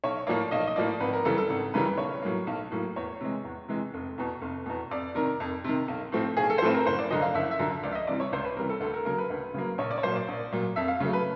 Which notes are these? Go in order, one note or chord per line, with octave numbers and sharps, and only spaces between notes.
B1 C#5
A2 F3 A#3 D5
B1 D#5
D#5
A2 F3 A#3 D5
G#1 B4
A#4
F#2 C#3 E3 G3 A4
A4
G#1
F#2 C#3 E3 G3 B4
B1 C#5
A2 F#3 A#3
B1
A2 F#3 A#3
E2 C#5
C3 E3 G#3
E2
C3 E3 G#3
F1
E2 B2
F1
E2 B2
F2 D5
C3 D#3 A#4
F2
C3 D#3
B1
A2 F3 A3 C4
B1 G#4
A4
C5
A2 F3 A3 C4 B4
A#4
F#1 C5
D5
F#2 D3 F3 D#5
F5
F#1 E5
E5
F#2 D3 F3
C#2 D5
E5
D#5
C3 E3 G3 D5
C#5
C#2 C5
B4
C3 E3 G3 A#4
A4
D2 A4
A#4
C#3 F#3 A#3 A#4
B4
D2
C#3 F#3 A#3
A#1 C#5
D5
C#5
A#2 F#3 C5
D5
A#1
A#2 F#3
F2 E5
F5
C#3 F#3 A3
B4